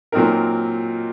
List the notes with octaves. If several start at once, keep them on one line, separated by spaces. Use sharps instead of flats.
A#2 F#3 C4 D#4 A#4